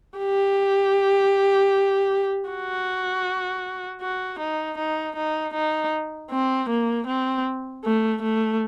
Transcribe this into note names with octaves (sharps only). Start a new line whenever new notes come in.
G4
F#4
F#4
D#4
D#4
D#4
D#4
C4
A#3
C4
A3
A3